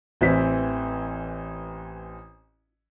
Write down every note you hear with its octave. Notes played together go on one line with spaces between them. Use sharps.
A1 E3 C4 B6